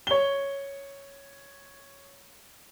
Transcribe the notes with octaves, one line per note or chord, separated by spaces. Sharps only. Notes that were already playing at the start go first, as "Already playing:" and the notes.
C#5 G7